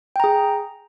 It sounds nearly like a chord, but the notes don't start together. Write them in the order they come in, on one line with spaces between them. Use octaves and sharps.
G5 A#5 G#4